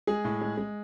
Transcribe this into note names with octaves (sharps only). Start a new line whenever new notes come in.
G#3 G#4
A2
G#3
G#3